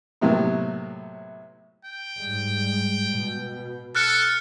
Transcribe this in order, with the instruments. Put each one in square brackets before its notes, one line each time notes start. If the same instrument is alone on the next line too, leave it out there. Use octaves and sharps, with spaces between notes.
[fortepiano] A2 C3 F#3 A#3 B3
[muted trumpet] G5
[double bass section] G#2 G3 G#3
B2
[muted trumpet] A4 [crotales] F6 F#6 C#7